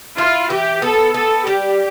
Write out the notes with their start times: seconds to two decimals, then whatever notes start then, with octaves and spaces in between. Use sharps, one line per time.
0.18 E4 F4
0.50 E3 G4
0.82 B3 A4
1.14 B3 A4
1.46 G3 G4